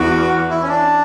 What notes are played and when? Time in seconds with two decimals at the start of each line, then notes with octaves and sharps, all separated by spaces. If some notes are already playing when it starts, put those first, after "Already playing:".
Already playing: E2 F#4
0.50 E4
0.63 C#4
0.68 D4